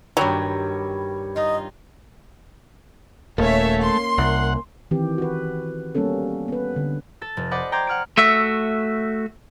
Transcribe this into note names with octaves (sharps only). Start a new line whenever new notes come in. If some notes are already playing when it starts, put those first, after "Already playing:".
G2 D#3 F#3 G3 C#5 E6
D#4 F4 D#5
D#1 A3 A#3 C#4 C#5 E5
C6
C2 F#5
D#3 E3 C4 G4
F#4 B4
G3 A#3 B3 C#4 A4
B3 B4
D3
A4 A6
F1
C5 D5 D#5 F#5 B5 D6
G5 A#5 C6 D6 G6 G#6
F#5 F6 G#6 D7
A3 F#4 E5